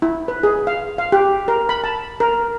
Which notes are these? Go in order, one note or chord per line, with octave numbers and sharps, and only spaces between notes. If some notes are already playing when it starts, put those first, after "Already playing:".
E4
B4
G#4
F5
F5
G4
A#4
B5
A5
A#4